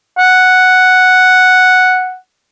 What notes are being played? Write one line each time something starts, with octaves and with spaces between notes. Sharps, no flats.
F#5